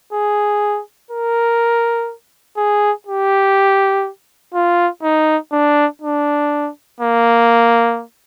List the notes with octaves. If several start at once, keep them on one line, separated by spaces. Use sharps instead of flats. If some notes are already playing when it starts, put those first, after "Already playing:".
G#4
A#4
G#4
G4
F4
D#4
D4
D4
A#3